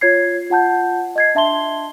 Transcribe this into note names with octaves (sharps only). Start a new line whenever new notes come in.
F4 C#5 G#6 C7
F4 F#5 A5 G6
D#5 G#6 C7
D4 E5 A5 C6 G7